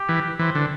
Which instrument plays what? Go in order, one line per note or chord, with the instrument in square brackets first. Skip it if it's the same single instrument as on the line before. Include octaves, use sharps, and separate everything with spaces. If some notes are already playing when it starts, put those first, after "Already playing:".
Already playing: [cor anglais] G4
[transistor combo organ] E3
[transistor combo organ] E3 [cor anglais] C5
[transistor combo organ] D3